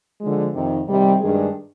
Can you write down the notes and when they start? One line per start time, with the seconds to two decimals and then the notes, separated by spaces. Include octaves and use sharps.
0.20 D3 F3 G#3
0.53 F2 C3 D#3
0.87 C3 D#3 G3
1.21 G2 D#3 G#3 D4 G#4